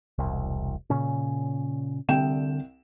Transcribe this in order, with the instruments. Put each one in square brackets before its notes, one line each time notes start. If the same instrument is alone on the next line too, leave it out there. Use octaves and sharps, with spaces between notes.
[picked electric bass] E1 C2
A#2 C#3 C#4
[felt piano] C2 G5 E7 [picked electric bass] D3